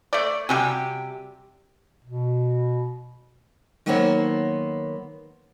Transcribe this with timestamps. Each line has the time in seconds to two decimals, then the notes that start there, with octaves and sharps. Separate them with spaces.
0.13 A3 D5
0.49 C3 G3 F#4 G4 G#5
2.05 B2
3.86 D#3 F#3 A#3 B3 C5 C#5